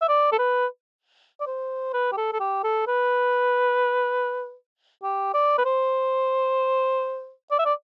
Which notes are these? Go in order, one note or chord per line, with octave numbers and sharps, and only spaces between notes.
E5
D5
A4
B4
D5
C5
B4
G4
A4
A4
G4
A4
B4
G4
D5
B4
C5
D5
E5
D5